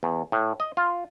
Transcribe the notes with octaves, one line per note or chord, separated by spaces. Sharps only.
E2
A2
D#5
F4